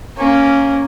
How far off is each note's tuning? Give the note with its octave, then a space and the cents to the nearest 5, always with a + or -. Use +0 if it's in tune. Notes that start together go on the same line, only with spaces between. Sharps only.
A#3 -10 C#4 +0